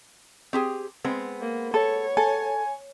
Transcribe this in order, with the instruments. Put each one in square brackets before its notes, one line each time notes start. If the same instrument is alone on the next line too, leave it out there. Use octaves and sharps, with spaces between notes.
[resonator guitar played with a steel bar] C4 G4 G#4
G#3 B3 C4
[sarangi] A#3
[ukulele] A4 [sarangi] C#5
[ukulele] A4 [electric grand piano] G#5